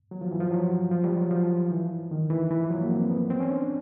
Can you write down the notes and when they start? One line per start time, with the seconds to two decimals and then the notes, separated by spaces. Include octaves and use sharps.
0.11 F#3
0.21 F3
0.31 E3
0.40 F3
0.51 F#3
0.91 F3
1.04 G3
1.18 F#3
1.31 F3
1.71 E3
2.11 D#3
2.30 E3
2.51 E3
2.60 F3
2.70 F#3
2.81 A#3
2.91 C4
3.10 B3
3.30 C4
3.40 C#4
3.51 D4